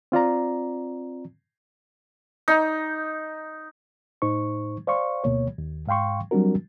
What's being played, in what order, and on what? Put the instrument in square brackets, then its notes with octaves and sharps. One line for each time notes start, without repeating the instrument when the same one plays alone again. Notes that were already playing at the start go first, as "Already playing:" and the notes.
[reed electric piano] C4 F4 D5 A#5
[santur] D#4
[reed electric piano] A2 D#4 C5 C#6
C5 D5 F5 C6 C#6
D2 B2 A#3 C#5
D#2
G#2 F5 G5 C6 C#6
F#3 G3 C4 D4 F#4 A#4